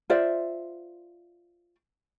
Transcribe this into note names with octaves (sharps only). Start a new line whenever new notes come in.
F4 C5 D5 E5